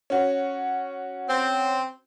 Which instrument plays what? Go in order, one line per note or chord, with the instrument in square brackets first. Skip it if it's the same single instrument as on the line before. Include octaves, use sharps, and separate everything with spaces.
[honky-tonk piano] C#4 F#4
[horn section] C4